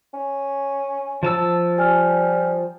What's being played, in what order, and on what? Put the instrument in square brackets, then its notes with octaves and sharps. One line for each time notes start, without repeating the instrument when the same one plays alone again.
[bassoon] C#4
[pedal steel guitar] F3 A5 E6
[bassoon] G3 [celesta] G#5 F6